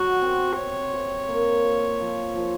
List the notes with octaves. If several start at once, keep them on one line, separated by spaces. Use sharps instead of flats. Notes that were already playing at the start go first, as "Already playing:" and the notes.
Already playing: F#3 F#4
C4
C3 C#5
C3
A#3
F4
F3
F3